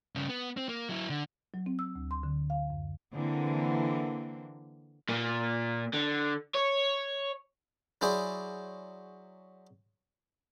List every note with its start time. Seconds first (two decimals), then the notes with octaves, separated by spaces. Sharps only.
0.15 G2 C#3
0.29 B3
0.57 C4
0.69 A#3
0.89 F#3 E4
1.10 D3
1.54 F#3
1.66 C4
1.79 E6
1.96 D2
2.11 C6
2.23 D3
2.50 F5
2.70 F#2
3.13 D3 E3 A#3 C4
5.09 A#2 A#3
5.94 D3
6.55 C#5
8.01 F#3 E4 G#4 C5 D5